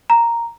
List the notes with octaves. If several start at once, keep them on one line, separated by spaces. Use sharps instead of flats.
A#5